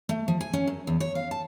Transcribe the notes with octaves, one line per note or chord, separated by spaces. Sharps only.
A3
F3
G#5
C#4
F#2
E2
C#5
F5
A5